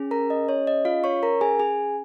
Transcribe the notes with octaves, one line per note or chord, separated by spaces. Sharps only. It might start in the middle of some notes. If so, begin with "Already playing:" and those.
Already playing: C#4 G#4
A#4 A#5
D#5
C#5
D#5
F4 F5
C#5 C#6
A#4 A#5
G#4 G#5
G#4 G#5